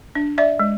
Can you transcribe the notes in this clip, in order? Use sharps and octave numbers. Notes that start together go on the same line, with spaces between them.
D4
D5 E5
G#3